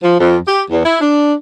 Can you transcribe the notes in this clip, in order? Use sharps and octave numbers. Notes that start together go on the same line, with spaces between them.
F3
F2
G4
E2
E4
D4